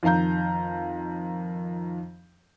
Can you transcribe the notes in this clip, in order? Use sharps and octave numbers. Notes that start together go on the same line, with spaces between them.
F2 D#3 F5 A#5 G6